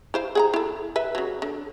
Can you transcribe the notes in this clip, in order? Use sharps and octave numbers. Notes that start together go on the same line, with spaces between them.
E4 C5 F5
G#4 F#5 A#5
E4 A4
B4 E5
C#3 F#3
D3